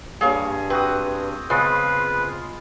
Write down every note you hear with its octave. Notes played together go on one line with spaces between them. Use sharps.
G2 G3 A#3 G#4 C#5
C4 F#4 B4 D#6
C#3 G#3 B3 C4 F4 B4